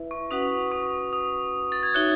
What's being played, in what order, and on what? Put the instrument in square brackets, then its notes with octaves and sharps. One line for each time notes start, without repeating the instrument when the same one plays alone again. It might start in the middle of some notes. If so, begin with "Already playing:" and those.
Already playing: [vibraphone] E4 B4 E5
[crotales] C#6
[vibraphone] C#4 F#4 B4 F#5 [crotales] D#6
[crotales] C#6
D#6
A6
G#6
[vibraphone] D#4 F#4 C#5 E5 [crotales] F#6